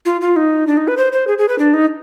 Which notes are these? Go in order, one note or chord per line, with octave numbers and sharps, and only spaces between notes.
F4
F4
D#4
D4
D#4
B4
C5
C5
G#4
G#4
B4
D4
D#4